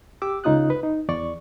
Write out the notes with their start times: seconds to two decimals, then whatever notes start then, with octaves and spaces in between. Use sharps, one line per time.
0.22 G4 D6 E6
0.44 C#2 C#3 D#4 F4 D#6 F#6
0.70 B4
0.83 D#4
1.08 E2 D5 C#6